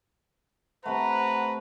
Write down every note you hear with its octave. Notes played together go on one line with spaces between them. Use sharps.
C3 A3 B4 F#5 A#5